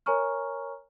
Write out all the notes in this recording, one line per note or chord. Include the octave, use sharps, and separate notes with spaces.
A#4 C#5 G#5 A#5 C#6 F6